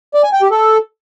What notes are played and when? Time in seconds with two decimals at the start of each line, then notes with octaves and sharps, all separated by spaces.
0.14 D5
0.24 G#5
0.33 G5
0.42 G4
0.51 A4